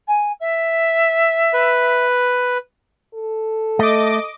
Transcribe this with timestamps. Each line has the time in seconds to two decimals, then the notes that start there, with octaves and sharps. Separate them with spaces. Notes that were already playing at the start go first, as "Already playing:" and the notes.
0.07 G#5
0.40 E5
1.54 B4
3.15 A4
3.79 A3 D#5 D6